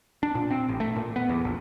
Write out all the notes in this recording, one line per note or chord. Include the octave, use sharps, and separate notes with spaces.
D4
A#2
C4
A1
A3
A#2
B3
E2
A#1